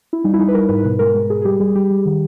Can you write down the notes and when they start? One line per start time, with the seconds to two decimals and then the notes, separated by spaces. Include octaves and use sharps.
0.13 E4
0.24 G3 D#4
0.33 E4
0.39 G3 D#4
0.48 B4
0.54 G3 A#4
0.69 G#2 B4
0.84 B2 B4
0.99 G#3 A#4
1.14 G#3
1.29 G#3 G#4
1.41 G#4
1.45 G3 G4
1.60 G3 G#4
1.75 G3 G4
1.90 G3
2.05 D#3